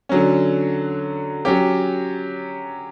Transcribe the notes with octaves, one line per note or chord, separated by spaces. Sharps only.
D3 F#3 C#4
F#3 C#4 G4